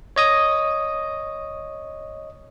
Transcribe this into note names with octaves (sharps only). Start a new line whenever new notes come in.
C#5 D#5 D#6